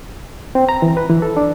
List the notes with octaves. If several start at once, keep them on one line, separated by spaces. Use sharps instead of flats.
C4
A#5
E3
B4
E3
A4
D4